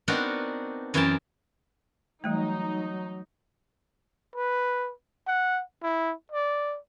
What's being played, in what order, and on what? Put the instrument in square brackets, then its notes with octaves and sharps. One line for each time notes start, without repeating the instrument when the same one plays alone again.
[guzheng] B3 C4 D4 D#4 F#4 A#4
F#2 E3 E4 A#4 G5 A5
[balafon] E3 G3 A3 [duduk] F#3 [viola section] D#4
[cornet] B4
F#5
E4
D5